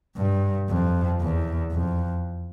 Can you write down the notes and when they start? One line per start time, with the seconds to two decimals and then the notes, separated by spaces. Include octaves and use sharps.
0.16 G2
0.69 F2
1.21 E2
1.72 F2